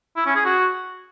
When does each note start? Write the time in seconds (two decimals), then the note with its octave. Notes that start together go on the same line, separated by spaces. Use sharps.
0.17 E4
0.26 C#4
0.36 G#4
0.45 F#4